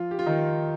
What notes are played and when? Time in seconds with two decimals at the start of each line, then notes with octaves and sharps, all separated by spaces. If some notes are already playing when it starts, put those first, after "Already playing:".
Already playing: F3 F4
0.11 G4
0.19 F4
0.26 D#3 D#4